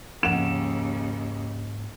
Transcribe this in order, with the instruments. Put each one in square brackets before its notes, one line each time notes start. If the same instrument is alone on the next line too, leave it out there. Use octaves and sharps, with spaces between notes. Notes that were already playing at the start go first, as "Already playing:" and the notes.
[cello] D#2 C#3 [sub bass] G#2 [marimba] F3 F#5 [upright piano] E7